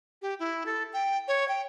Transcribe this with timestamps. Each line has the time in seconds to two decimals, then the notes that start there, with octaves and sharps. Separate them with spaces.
0.22 G4
0.39 E4
0.66 A4
0.93 G5
1.28 C#5
1.48 G5